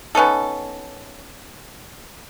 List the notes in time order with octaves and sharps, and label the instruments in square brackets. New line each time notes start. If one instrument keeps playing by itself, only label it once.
[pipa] B3 C#4 D#4 A4